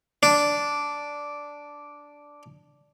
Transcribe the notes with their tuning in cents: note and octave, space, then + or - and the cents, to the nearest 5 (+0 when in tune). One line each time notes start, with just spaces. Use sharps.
D4 -5